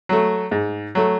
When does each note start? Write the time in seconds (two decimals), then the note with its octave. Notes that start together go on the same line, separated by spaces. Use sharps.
0.09 F#3 A3
0.51 G#2
0.95 F#3 A3